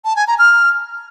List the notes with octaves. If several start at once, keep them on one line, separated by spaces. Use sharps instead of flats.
A5
G#5
A#5
F6